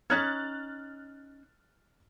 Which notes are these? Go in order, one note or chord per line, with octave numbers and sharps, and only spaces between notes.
C#4 D#4 C#5 F6 F#6 A6